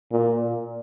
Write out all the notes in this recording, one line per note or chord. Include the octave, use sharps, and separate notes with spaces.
A#2